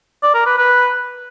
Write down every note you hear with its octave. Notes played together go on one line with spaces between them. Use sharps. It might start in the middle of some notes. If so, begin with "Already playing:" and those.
D5
A#4
B4
B4